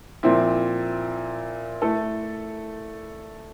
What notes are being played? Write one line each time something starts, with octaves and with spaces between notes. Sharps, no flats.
A#2 F3 C4 E4
A3 E4 A4